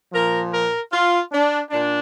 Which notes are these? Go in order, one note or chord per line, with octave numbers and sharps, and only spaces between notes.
A#2 F3 A#4
A#4
F4
D4
A#2 D4